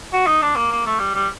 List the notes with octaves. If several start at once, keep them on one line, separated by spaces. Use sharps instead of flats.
F#4
D#4
D4
A#3
A#3
A3
G3
G3